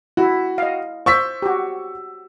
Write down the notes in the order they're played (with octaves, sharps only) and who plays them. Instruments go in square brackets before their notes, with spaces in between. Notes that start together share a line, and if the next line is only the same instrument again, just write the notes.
[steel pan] E4 [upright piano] F#4
[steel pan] D#5 F5
[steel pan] C5 [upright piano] C#6 E6 B6
[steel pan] F#4 G4